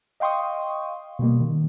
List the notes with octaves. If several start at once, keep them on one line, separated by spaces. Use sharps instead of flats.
D#5 F5 G5 C6 C#6 D#6
B2 G3 A#3
D#3